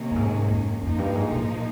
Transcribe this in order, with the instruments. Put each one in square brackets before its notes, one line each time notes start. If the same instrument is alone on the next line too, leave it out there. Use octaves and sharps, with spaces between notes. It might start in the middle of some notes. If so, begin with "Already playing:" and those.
Already playing: [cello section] C3 D#3 A#3 C#4
[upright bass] G2
G#2
F2
[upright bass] F2 [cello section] F3 A#3 D#4
[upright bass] G2
G#2
A#2